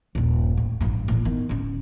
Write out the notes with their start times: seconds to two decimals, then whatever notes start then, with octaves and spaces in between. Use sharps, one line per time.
0.15 D#1 G2
0.57 A2
0.81 A1 G2
1.08 A2 E3
1.25 D#3 B3
1.49 D1 C#4